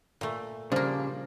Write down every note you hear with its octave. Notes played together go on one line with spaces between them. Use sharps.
A#2 A3
C#3 F3 G3 A#3 D4